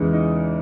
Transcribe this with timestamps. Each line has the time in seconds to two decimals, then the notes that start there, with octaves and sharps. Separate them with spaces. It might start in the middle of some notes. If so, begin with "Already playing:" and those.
Already playing: E2 C#3 E3 G#3 E4
0.13 D#4